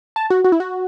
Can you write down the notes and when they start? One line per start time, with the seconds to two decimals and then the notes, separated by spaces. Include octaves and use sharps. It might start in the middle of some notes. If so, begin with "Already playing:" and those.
0.16 A5
0.30 F#4
0.45 F#4
0.52 E4
0.60 F#4